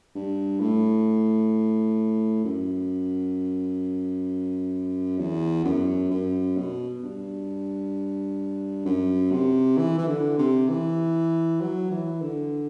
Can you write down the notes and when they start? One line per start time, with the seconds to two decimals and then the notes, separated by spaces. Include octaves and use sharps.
0.15 G2
0.61 A2
2.45 F#2
5.18 E2
5.65 F#2
6.11 F#2
6.57 B2
7.02 G2
8.85 F#2
9.32 C3
9.77 E3
9.98 E3
10.08 D3
10.38 C3
10.69 E3
11.61 F#3
11.91 E3
12.22 D3